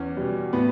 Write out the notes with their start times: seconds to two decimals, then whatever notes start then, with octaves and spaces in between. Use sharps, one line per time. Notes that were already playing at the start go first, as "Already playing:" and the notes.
Already playing: E2 C#4
0.17 B2 G3
0.53 A2 B3